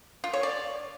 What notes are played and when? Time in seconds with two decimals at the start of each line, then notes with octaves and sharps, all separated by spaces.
0.24 F4
0.33 C#5
0.43 D5